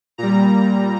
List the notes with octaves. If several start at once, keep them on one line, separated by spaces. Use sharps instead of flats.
A#2 G3 A#5